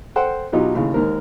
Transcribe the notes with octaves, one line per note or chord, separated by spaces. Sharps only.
A4 C5 F#5 G5
B2 F#3 D#4 F4 G4
D#2 A2 C#3
D#2 G#2 A#4